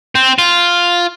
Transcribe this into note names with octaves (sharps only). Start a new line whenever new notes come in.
C4
F4